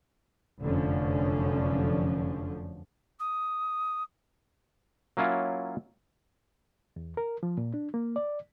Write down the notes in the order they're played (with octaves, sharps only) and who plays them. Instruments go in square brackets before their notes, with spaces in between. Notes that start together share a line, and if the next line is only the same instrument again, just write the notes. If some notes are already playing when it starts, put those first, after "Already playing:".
[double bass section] F1 F#2 D3 F3 C#4
[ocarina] D#6
[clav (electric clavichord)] F#3 A#3 C#4 E4 F4
[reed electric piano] E2
A#4
F3
A#2
D4
A#3
D5